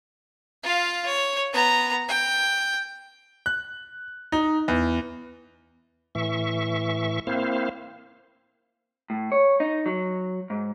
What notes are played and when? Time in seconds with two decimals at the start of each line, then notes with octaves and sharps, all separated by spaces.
0.63 F4 F5
1.06 C#5
1.53 B3 A#5
2.09 G5
3.46 F#6
4.32 D#4
4.68 E2
6.15 A2 E3 E5 C#6
7.27 A#3 C4 E4 C5 F5
9.10 A2
9.32 C#5
9.60 D#4
9.86 F#3
10.50 G#2